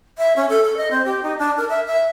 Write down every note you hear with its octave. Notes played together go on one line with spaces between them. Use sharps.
E5
C#4
A4
A4
D#5
C4
G4
D#4
D4
A#4
E5
E5